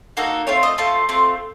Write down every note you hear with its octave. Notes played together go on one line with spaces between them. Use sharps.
A#3 D#4 F#4 A4
A3 C4 F4 C#5
D#5
A3 C4 F4 A5
A3 C4 F4